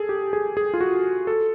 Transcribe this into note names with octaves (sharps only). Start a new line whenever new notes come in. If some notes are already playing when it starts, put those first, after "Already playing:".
Already playing: G#4 A4
G4
G#4
G#4
F4
F#4
A4